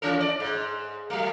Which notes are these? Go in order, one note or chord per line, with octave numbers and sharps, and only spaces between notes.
E3 C#4 A4
D5
G#2
F#3 A3